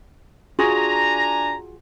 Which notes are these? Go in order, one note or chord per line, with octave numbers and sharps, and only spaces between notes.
D4 F4 F#4 G#4 G#5 A#5